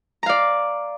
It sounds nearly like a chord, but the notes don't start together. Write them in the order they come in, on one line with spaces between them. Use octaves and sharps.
A#5 F5 D5